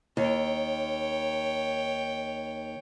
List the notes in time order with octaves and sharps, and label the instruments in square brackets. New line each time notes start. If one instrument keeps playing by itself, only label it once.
[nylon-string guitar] D#2 [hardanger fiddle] C#5 G5